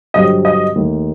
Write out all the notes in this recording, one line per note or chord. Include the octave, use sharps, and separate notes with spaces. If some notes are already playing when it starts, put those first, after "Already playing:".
G2 D3 F#3 C4 G4 D#5
D#5
D#2 D#3 A3 D#4